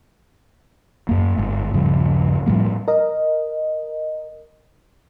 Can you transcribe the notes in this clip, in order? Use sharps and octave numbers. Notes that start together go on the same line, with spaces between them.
F#2 A#3
G1 G#2
D#1 G2 C#3 F3
A2 F3 G3 A#3
A#4 D#5